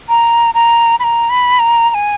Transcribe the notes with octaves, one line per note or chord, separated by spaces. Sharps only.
A#5
A#5
B5
A#5
B5
A#5
A#5
G#5